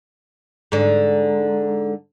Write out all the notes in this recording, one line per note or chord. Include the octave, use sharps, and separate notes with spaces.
G#2 D3